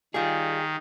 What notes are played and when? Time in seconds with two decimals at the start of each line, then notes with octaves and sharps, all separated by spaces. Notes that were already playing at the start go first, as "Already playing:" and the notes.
0.14 D#3 G3 F4 G#4